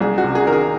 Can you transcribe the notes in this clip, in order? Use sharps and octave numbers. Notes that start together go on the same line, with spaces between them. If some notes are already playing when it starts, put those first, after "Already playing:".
C2 G#4
F#4
C3
G#4
D#3 A#4
G#4